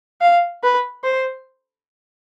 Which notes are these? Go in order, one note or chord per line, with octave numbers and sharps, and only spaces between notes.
F5
B4
C5